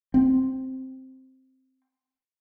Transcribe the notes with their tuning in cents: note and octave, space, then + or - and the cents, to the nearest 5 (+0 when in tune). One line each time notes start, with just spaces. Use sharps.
C4 +0